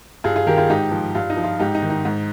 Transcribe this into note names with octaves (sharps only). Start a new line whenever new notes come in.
G2 F4 G#4
F4 G#4
D#3 G4 A#4
F4 G#4
G#2 D#4 G4
F3
G2 F4
D#4
F3
F4
G#2 D#4 G4
D#4
D#3
D#4
G#2